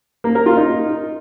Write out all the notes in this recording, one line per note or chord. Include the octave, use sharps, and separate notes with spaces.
A#3
A#4
F4
D#4